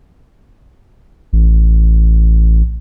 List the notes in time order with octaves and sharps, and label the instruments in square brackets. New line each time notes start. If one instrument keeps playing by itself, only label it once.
[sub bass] A1